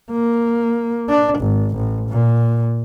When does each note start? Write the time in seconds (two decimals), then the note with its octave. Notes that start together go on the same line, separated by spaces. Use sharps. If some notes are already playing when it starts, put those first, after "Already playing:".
0.11 A#3
1.09 D4
1.39 G#1
1.76 A1
2.10 A#2